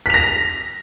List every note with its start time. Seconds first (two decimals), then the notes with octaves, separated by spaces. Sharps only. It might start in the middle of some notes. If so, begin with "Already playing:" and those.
0.06 B6
0.10 F7
0.14 A#6